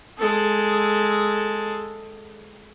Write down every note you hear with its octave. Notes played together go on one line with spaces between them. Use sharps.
G#3 A4